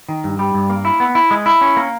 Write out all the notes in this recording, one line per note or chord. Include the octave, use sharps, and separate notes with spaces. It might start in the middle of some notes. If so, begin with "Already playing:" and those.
D#3
G2
G3
G2
A#3
E4
B3
E4
G#3
E4
C#4
A#3